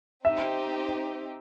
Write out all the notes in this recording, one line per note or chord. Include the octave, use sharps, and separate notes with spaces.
C4 D#4 G4 E5